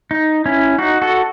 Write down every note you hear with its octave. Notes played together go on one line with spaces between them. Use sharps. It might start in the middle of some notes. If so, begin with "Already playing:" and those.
D#4
C#4 E4
D#4 F#4
F#4 A4